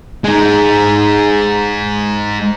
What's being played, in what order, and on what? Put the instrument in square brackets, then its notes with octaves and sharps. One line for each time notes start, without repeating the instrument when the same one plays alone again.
[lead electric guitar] G#3 D#4